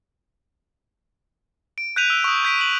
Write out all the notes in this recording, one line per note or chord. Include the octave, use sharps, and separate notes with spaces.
D7
F#6 G6 B6 D#7 F7
E6
C#6 D#6
C#6 G6 B6 D7
F#7